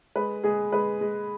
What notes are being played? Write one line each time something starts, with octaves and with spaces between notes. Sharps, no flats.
G#3 B4
G#3 G#4
G#3 B4
G#3